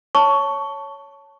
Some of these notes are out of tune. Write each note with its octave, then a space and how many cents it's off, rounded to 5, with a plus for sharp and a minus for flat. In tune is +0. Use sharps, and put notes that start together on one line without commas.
C#5 +0 A5 +0 C#6 +15